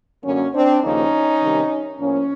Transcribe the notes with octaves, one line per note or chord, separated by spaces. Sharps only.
F#2 D3 F#3 A#3 C#4
C4 D4
D#2 C#3 F3 A#3 C#4 D#4
C3 D#3 G3
A2 F3 A#3 C#4